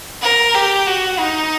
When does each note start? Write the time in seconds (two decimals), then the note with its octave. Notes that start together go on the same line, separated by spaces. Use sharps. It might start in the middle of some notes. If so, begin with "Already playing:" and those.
0.22 A#4
0.55 G4
0.87 F#4
1.19 D#4